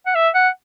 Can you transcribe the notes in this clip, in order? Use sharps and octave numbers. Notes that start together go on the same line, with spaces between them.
F#5
E5
F#5